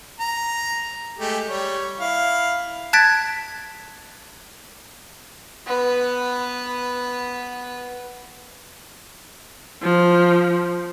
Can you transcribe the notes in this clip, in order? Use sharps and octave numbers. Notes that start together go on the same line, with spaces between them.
A#5
G#3 A3 G4
G3 C#5
E4 F5
A5 F#6 G#6 A6 B6 D7
B3 B4
F3